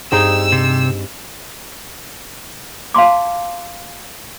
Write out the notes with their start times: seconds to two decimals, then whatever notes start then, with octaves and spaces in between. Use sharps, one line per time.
0.12 G2 C4 D#4 G4 G#4 E6 D7
0.52 C3
2.94 F5 A5 C6 D6